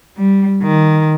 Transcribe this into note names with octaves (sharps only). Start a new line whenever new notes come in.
G3
D#3